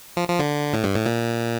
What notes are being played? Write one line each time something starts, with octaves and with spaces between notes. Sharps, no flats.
F3
F3
D3
A2
G2
A2
A#2